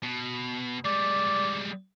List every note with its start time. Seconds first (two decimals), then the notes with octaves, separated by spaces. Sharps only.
0.04 B2
0.85 G3 G#3 D5